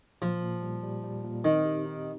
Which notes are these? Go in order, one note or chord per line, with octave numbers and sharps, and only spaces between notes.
A#2 F3
A#2
G3
G3
G3
A#2
D#3 C4
G4
D#4